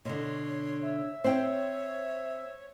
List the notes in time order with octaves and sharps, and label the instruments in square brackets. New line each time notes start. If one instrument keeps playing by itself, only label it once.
[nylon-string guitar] B2 D3 [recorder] C#5 [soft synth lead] C6
[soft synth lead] E5
[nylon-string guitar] C4 G5 [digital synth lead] C5 [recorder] C#5